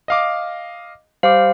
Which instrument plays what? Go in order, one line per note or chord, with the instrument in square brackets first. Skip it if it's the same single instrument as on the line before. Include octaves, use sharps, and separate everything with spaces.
[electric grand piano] D#5 F5 D6
[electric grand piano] G3 D6 [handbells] C5 F5